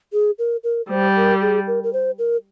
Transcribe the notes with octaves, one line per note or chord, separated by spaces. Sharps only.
G#4
A#4
A#4
G3 C5
A#4
G#4
A#4
A#4
C5
A#4